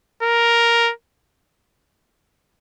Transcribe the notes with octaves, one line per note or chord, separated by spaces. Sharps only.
A#4